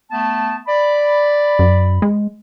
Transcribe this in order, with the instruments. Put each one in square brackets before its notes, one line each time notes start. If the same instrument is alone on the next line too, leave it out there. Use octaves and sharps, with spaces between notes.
[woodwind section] A3 B3 A5
D5 B5
[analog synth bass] F#2
G#3